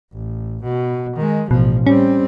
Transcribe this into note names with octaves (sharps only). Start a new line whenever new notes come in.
A1
B2
D#3 G#3
A1 B2 F3
G3 C4 C#4